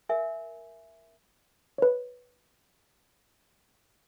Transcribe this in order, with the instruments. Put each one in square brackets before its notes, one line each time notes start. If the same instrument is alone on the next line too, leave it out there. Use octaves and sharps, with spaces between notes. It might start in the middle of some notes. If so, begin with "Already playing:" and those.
[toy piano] A#4 E5 G#5
[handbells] B4 C#5